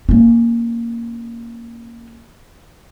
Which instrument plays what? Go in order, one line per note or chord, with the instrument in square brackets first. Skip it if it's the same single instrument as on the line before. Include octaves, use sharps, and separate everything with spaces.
[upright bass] A#3 C#4